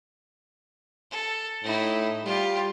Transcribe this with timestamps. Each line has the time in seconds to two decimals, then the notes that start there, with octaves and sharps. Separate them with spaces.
1.11 A4
1.64 A2 D#4 E4
2.25 G3 F4 G4